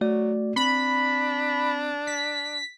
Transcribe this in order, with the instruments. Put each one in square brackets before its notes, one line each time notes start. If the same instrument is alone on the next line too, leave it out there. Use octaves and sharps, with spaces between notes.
[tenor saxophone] F#3 [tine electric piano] A3 F#4 D5
[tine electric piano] C4 [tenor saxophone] D4 [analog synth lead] B5
[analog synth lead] B6